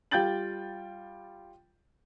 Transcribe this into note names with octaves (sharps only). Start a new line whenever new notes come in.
G3 F4 G5 G6 A6 F#7